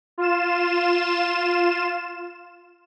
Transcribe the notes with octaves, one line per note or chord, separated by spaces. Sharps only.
F4 E7